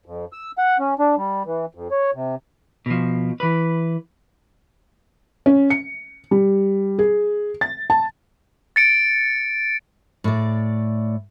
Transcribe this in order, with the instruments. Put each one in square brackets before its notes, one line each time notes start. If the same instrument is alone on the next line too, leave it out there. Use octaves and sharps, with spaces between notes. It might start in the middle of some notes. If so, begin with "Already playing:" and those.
[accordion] F2
E6
F#5
C#4
D4
G3
E3
F2
C#5
C3
[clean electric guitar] B2 F3
E3 B4
[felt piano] C#4
C#7
G3
G#4
A6
A5
[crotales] A6 C#7 D7
[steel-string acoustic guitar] A2 D5